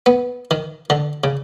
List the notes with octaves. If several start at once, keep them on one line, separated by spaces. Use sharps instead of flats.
B3
D#3
D3
C#3